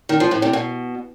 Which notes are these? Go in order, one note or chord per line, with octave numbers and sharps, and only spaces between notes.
D#3
F3
A2
C3
B2